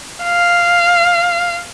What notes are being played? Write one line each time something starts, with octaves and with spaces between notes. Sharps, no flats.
F5